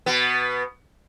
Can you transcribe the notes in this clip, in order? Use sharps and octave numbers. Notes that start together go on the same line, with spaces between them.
B2 B3